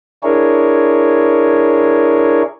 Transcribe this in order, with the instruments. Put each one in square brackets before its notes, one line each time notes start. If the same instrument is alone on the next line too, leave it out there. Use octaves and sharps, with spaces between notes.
[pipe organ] D4 E4 G#4 A#4 C#5